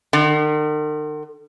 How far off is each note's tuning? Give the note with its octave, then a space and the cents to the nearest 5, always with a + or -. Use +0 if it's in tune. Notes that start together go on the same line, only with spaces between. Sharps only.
D#3 -45